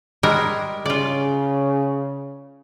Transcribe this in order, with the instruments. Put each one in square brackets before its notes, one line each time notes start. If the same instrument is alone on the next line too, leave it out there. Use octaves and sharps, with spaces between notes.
[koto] G3 G#3 A#4
[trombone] C#3 [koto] F4 D5